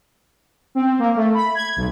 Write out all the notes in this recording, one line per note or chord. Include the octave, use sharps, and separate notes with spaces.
C4
A#3
A3
B5
G#6
B1